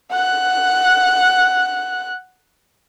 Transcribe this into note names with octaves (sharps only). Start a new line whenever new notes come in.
F#5 F#6